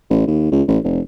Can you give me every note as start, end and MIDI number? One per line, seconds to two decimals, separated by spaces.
0.10 0.24 33
0.27 0.51 39
0.51 0.63 37
0.68 0.78 33
0.84 1.00 29